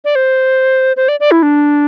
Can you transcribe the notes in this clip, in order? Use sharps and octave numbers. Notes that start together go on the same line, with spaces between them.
D5
C5
C5
D5
D5
E4
D4